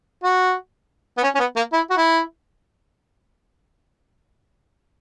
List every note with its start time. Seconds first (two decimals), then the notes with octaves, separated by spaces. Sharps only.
0.24 F#4
1.18 B3
1.23 C#4
1.35 C#4
1.39 B3
1.56 A#3
1.73 E4
1.90 F#4
1.97 E4